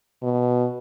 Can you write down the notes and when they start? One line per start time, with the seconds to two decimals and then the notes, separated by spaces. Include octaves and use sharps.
0.23 B2